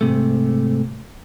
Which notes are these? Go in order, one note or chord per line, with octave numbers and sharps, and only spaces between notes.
G#2 C3 A3